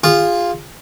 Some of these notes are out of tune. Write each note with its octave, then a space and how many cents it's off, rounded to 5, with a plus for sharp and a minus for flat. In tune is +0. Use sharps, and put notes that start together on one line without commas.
F4 +0 G#4 -30